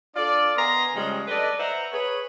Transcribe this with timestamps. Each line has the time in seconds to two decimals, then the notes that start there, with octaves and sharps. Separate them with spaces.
0.16 D4 F4 A4 D5
0.56 B3 D#5 G#5 A#5 C6
0.94 C#3 F3 G3 G#3 C4 C#4
1.27 A4 B4 D5 D#5
1.59 B4 C5 E5 F#5 A#5
1.92 G#4 B4 C#5